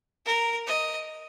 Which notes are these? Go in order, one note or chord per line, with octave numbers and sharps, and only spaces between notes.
A#4
D#5